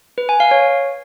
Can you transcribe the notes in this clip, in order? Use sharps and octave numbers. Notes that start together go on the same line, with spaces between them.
B4
G#5
F5
C#5